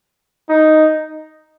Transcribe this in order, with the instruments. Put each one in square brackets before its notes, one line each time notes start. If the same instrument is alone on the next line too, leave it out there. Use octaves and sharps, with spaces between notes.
[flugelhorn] D#4